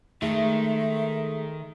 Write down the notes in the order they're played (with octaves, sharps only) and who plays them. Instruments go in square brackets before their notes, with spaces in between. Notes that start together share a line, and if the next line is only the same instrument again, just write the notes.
[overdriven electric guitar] D#3 [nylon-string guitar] G#3 A3 [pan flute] E5